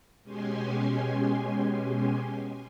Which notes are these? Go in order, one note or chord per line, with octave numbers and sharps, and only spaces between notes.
B2 G#3 C#4 G4 G#5 C6